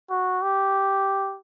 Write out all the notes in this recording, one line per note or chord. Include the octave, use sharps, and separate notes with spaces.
F#4
G4